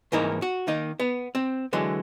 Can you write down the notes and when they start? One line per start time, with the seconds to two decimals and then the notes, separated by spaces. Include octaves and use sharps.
0.12 C2 G#2 E3 A#3 D#4 A#4
0.42 F#4
0.68 D#3 A#3 D#4
1.00 B3
1.35 C4
1.73 D3 E3 F#3 G#3